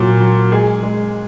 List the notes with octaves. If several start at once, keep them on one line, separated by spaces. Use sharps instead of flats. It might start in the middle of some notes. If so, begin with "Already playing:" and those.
Already playing: A#2 F#3
F#3
G#3 G#4
G#3